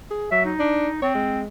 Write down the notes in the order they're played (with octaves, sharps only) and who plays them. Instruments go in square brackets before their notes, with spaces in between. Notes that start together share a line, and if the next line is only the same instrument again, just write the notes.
[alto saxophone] G#4
[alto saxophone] F#3 [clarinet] E5
[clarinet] D#4
[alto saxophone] D4
[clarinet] C4 [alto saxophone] C#5
[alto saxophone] G#3